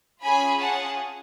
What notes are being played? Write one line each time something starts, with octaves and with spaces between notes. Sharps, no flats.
C#4 F4 G#4 G#5 B5
F#5 A5